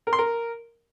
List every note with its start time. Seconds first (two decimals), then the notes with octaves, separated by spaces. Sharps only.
0.07 A#4
0.13 C6
0.18 A#4